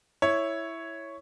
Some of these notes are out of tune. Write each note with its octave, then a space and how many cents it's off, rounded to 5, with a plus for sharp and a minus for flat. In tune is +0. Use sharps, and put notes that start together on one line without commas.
E4 +0 C#5 +0